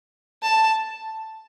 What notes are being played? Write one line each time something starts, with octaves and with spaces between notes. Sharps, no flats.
A5